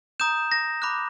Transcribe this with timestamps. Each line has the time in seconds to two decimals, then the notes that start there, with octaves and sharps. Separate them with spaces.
0.20 A#5 D#6 G6 E7
0.52 A#6
0.82 B5 D6 F#6